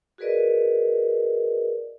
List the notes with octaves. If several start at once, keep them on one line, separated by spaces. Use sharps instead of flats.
F#4 G#4 A#4 B4 D5 D#5